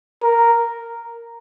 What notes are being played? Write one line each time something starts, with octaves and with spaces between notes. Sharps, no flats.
A#4